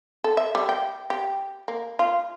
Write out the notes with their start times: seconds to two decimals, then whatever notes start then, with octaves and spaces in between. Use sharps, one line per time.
0.24 A4
0.37 E5
0.55 G3
0.69 G5
1.10 G4
1.68 A#3
1.99 F4